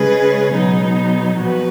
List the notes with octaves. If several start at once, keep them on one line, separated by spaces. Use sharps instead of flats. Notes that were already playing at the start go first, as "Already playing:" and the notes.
Already playing: C#3 G#3 C#4 G#4 B4
B2 F#3 B3 D#4
A#2 F3 B3 F#4 B4